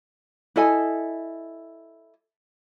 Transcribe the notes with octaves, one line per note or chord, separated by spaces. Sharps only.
E4 A4 D#5 G#5